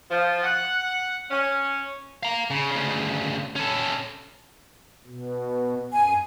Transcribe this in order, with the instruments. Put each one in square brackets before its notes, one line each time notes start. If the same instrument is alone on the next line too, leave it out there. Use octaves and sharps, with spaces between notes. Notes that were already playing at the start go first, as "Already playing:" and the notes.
[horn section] F3
F#5
C#4
[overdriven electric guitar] F5 A#5
C#3
D2 C#3
C#4 A4
[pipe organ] B2
[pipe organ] F#2 [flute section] G#5